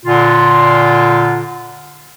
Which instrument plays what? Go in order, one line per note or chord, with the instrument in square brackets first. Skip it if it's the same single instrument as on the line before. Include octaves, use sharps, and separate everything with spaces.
[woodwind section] A#2 D3 F4